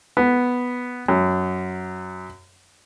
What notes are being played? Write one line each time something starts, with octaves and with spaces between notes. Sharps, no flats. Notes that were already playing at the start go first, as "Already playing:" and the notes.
B3
F#2